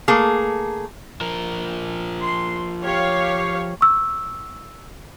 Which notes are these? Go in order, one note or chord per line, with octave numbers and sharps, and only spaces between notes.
A3 A#3 G#4
F3 A#4
C6
G4 C#5 F5
C#6 E6